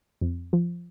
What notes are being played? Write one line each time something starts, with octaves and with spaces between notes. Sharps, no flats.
F2
F3